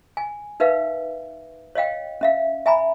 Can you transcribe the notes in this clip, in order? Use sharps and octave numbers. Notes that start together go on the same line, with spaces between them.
G#5
D#4 A#4 B4 E5 F5
C#5 D#5 F5 G5
C#4 E5 F5
E5 G#5 A#5 B5